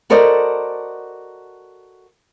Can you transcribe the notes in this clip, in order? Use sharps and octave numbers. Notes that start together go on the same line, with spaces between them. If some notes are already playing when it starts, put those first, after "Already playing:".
F#4 A4 A#4 C5 D5 D#5